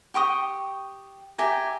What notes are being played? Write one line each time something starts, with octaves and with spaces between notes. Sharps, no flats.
G4 G5 C#6 D#6
G4 E5 G#5 A#5